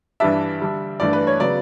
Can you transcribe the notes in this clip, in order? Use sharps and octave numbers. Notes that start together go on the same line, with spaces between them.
G2 E3 G3 D4 E5
D3 G3 D4
G2 E3 A3 D4 D5
B4
C#5
C#3 F#3 B3 D5